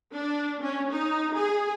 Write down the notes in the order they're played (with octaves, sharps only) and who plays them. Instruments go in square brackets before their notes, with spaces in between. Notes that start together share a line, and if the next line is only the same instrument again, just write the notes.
[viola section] D4
C#4
D#4
G#4